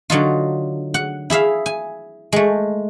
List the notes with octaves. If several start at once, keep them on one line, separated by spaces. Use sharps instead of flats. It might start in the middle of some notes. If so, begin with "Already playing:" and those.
D3 F#3 D#4 F4
F#5
E4 G#4 E5 F5
G#5
G#3 A3